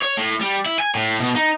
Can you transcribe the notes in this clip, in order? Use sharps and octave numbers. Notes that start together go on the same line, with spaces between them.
C#5
A2
G3
E4
G#5
A2
B2
D#4